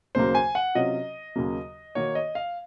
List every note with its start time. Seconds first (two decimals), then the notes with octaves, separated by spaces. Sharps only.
0.15 D#2 C#3 F#3 A#3 C5
0.35 G#5
0.55 F#5
0.75 C3 F#3 C#4 F4 D#5
1.36 D#2 C#3 F#3 A#3
1.95 D#3 A#3 D#4 F#4 C#5
2.15 D#5
2.35 F5